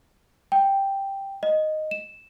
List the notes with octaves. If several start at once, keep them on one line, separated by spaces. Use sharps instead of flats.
G5
D#5
E7